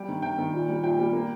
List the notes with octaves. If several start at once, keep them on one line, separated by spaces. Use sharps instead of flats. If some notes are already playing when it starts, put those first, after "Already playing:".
Already playing: G3 G5
D#3
D#3 G5
D#3
A#2
G3
A#2 G5
G3
A#3